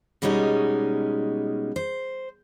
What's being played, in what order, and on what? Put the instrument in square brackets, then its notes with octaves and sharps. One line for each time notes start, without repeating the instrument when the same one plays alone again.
[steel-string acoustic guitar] B2 G3 G#3 C#4 D#4
C5